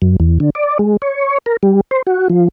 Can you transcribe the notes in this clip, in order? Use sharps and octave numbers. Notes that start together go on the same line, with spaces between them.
F#2
E2
D3
D5
G#3
C#5
A#4
G3
C5
F#4
F3